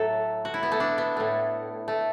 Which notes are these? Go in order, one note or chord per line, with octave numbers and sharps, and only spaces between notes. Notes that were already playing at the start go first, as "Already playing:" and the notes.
Already playing: A2 F#3 A3 A4
F#4
E4
B3
A3
D4
B3
A2 A3
A3